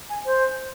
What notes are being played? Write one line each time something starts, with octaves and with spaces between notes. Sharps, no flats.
G#5
C5